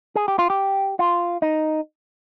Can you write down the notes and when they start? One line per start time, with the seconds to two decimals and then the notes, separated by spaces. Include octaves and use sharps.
0.15 G#4
0.28 G4
0.39 F4
0.50 G4
0.99 F4
1.42 D#4